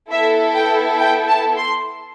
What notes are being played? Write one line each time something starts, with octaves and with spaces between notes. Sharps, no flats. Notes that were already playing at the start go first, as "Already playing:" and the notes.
B3 E4 A4 E5
G5
G5
A5
C6